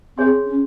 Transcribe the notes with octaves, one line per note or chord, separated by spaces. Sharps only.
C4 G#4 C#5 G#5 C6
C#4